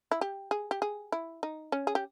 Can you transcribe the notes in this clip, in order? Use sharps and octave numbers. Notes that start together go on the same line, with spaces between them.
E4
G4
G#4
G4
G#4
E4
D#4
C#4
G#4
G4